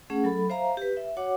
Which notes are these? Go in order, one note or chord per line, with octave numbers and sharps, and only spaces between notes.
A3 C#4 G#4 F#5
F#3 A4 B5
C5 E5 F5 A#5
G4 B4
E5
F#4 C#5 F#5 D6